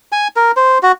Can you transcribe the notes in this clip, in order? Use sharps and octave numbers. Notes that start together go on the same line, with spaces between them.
G#5
A#4
C5
F#4